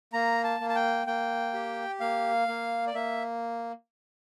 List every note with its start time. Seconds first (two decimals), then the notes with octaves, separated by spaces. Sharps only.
0.13 A#3 A#5
0.44 A5
0.60 A#3
0.69 A5
0.75 G5
1.07 A#3 G5
1.54 G4
2.00 A#3 F5
2.48 A#3
2.87 D5
2.94 A#3 E5